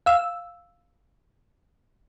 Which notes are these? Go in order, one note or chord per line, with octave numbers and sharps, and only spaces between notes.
F5 E6